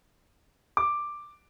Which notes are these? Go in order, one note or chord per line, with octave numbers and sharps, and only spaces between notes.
D6